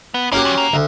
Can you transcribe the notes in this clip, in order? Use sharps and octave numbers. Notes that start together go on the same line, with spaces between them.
B3
A#3 C#4 F#4 G4
D2 F#3
A#3
D2